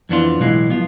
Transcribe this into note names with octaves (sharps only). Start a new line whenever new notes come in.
F2 E3 B3 D4 F4
B1 A2 E3 G#3
F3 B3 F4